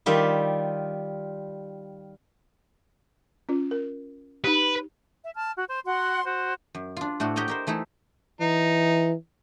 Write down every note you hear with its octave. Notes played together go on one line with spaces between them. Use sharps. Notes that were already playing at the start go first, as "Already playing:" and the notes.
D#3 G3 F4 E5
C#4 F4
A#4
D#4 G4 B4
E5
A5 F6
F#4
C5
F#4 F#5 C6
F#4 C5
F#2
D4 F4
A2 A3 D4 F#4
F#4 G4 C#5 D#5 A#5
G4 A#4 C5
E3 A3 D#4 E4
E3 D#4